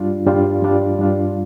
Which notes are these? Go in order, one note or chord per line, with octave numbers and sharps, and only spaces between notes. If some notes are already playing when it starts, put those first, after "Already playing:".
Already playing: G2 G3 D4 F4
G2 G3 D4 F4
G2 G3 D4 F4
G2 G3 D4 F4